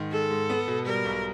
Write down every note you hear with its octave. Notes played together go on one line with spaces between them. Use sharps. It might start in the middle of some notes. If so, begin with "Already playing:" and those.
Already playing: G#2 D#3
G#3 A4
G#2
B3
B2
G3 A#4
B1